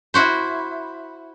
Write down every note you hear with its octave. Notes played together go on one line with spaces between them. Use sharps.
E4 F#4 C5